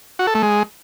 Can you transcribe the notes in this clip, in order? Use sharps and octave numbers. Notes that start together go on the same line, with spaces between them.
F#4
A4
A3
G#3